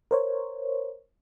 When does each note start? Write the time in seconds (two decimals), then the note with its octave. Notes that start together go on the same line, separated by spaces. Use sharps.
0.11 A#4 C5 C#5